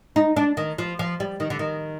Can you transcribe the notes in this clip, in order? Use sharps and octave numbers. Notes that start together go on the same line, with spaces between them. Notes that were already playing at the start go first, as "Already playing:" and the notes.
D#4
D4
D#3
F3
F3
G3
D#3
D3
D#3